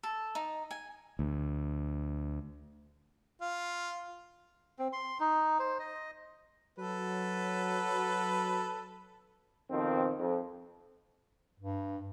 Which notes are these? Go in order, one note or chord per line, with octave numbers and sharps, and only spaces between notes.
A4
D#4
G#5
D2
F4
C4
C6
D#4
C5
D#5
F#3 A4 B4
F2 B2 D#3 C4
F2
G2